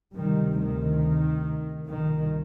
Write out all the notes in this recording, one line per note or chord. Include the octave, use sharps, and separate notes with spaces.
D2 C3 D#3 G3
D#3
C2 A#2 D#3